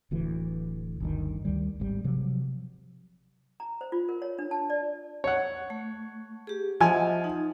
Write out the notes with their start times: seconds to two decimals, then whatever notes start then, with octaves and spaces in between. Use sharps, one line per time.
0.11 D1 D2 E3
1.00 G1 D2 D#3
1.45 D2 D#3 G3
1.80 G#1 F3 G3
2.04 C3 F3 F#3
3.60 A#5
3.81 C5
3.92 F4
4.09 A#4
4.22 C#5
4.39 D4
4.51 A5
4.70 D5
5.24 C#5 F#5
5.70 A3
6.47 G4 G#4
6.81 F3 D#5 E5 F#5 G#5
7.24 D#4